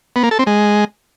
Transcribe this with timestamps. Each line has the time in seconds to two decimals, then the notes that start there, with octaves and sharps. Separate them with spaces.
0.16 B3
0.23 A#3
0.31 A4
0.39 C4
0.47 G#3